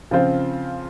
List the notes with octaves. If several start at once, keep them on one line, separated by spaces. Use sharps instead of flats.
C#3 F3 C4 F4 C5